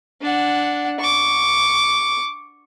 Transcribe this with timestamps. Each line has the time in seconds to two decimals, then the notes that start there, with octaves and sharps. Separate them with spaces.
0.21 D4 F#5
1.00 C#6 D6